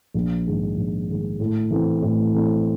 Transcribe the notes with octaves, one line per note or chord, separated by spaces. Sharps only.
A#1
G#2 D#3 G#3
A#1
G#2 D#3 G#3
A2
E3 A3 C4
A2
E3 A3 C4